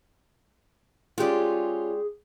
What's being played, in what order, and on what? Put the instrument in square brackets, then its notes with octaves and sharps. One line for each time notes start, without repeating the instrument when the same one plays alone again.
[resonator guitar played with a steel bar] G#3 G4 D5 [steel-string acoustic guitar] C#4 F4 [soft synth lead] G#4